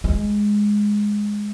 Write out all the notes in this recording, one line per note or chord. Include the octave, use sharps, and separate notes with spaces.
G#3